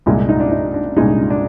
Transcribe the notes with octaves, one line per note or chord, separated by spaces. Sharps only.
C2 A#2 G#3 D4
D#4
D4
D#4
D4
C2 A#2 G#3 D#4
D4